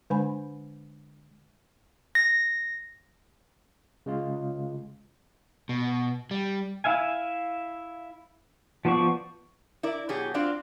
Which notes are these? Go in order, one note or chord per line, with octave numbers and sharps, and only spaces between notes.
D3 G#3 D4 C5 G#5 B5
A#6
C#3 G#3 F4
B2
G3
E4 E5 F5 G#5
F3 B3 C5 D5 C#6
E4 A#4 D5
B2 F#3 G4 G#4
C4 D4 F4 F#4 D5